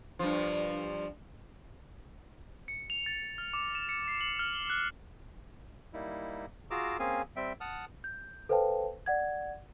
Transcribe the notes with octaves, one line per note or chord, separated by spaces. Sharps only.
G2 F3
C#7
F7
A6
F6
D6
E7
C#7
C7
F#7
F6
G7
F#6
G3 A#3 D#4 E4
F4 F#4 G#4 A#5 D6 E6
A#3 C4 C#4 G#4 F5 G#5
G3 C4 E5 G5
F#5 A5 D#6 F6
G6
A4 B4 C5 F5 G5 A5
D5 F#5 G#6